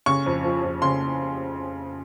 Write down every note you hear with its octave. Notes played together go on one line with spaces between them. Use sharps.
C#3 C#6
F2
F3
F2
C#3 C6